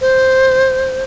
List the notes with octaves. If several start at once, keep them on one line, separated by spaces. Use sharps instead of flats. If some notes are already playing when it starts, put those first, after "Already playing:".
C5